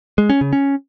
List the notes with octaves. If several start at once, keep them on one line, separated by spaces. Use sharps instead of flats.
G#3
C#4
C#3
C#4